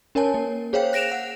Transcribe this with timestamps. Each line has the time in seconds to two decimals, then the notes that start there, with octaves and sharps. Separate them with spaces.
0.15 C#4 A#4 C#5 G#5 A5
0.34 A#3
0.73 G#4 C5 C#5 F5 G5
0.93 F#6 A#6 D7 E7 F7
1.12 F#5